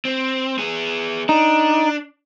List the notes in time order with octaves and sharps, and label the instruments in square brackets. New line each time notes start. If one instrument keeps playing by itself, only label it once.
[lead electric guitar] C4
B3 G#4
[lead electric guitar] D4 [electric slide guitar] D#4